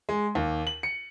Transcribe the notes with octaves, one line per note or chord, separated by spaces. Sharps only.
G#3
D#2
F#7
C#7